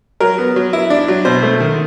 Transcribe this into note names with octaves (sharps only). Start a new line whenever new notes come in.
F#3 A#4
B3
F#3
E4
D4
F#3
B2 C5
A3
D#3